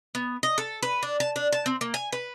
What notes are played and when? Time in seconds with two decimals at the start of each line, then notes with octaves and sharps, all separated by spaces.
0.15 B3
0.43 D#5
0.58 A4
0.83 B4
1.03 D4
1.20 A5
1.36 D4
1.53 A5
1.66 C4
1.81 A#3
1.94 G#5
2.13 B4